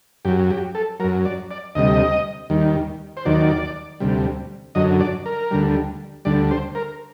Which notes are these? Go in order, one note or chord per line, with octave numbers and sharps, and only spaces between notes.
F#2 F#3 G4
G4
A4
F#2 F#3 A#4
D5
D5
D2 C3 G3 D#5
D#2 D#3 G3
C5
D#2 D#3 F#3 D5
D2 C3 G3
F#2 D3 F#3 D#5
D5
A#4
D2 D3 G3
D2 D3 G3 D5
C5
A#4